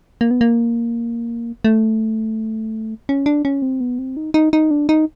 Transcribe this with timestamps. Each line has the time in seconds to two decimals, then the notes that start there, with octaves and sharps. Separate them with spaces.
0.21 A#3
0.31 B3
0.41 A#3
1.65 A3
3.09 C#4
3.26 D4
3.45 C#4
3.62 C4
3.81 B3
3.99 C4
4.17 D#4
4.34 D#4
4.53 D#4
4.71 D4
4.89 D#4